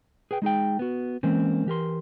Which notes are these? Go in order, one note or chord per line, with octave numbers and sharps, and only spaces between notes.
G#4 B4 G5
G#3 D#4 G#4 G5
B3 F#4
E3 G#3 A#3 C4 C#4
E3 G4 A#4 C6